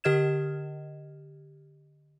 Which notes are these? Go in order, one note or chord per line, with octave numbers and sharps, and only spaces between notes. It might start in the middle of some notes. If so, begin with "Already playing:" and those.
D3 G4 D#5 F6 G#6 E7